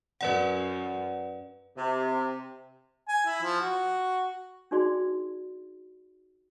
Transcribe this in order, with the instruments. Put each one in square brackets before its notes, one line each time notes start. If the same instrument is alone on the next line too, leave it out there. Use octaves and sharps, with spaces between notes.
[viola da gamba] F#2 [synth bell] B4 D5 F#5
[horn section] C3
[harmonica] G#5
E4
F3
F#4
[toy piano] D4 D#4 F#4 G#4 D5 C6